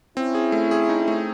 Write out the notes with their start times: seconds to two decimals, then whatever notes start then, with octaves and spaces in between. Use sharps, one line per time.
0.17 C4 C#4 E4
0.35 G#4
0.52 A3
0.71 G#4
0.89 D#4
1.08 A3